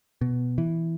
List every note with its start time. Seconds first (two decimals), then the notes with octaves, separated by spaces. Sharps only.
0.21 B2
0.58 E3